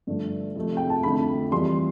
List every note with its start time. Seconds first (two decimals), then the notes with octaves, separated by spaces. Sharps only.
0.07 G2 D3 F3 A3
0.56 F2 C3 F3 A3
0.77 G5
0.90 A5
1.03 F2 D3 A3 B5
1.52 F2 E3 G3 C6